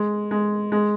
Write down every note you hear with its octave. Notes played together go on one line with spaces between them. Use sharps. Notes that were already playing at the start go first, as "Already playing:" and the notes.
Already playing: G#3
G#3
G#3